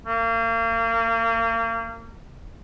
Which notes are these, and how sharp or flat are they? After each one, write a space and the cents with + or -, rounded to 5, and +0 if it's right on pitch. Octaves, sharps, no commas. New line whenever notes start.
A#3 -35